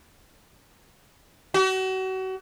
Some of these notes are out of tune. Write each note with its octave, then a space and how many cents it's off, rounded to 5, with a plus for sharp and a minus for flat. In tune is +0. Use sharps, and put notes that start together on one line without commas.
F#4 +35